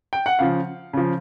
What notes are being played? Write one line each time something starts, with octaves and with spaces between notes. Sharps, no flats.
G5
F#5
C#3 F3 F5
C#3 F3